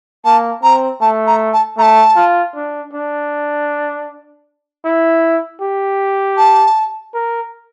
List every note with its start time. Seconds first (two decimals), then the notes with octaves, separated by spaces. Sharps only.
0.25 A#3 A5
0.63 C4 A#5
1.01 A3 A5
1.27 A#5
1.53 A5
1.78 A3 A#5
1.82 A5
2.16 F4
2.55 D4
2.93 D4
4.85 E4
5.61 G4
6.38 A5
7.14 A#4